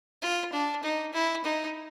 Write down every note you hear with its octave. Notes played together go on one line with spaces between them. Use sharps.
F4
D4
D#4
E4
D#4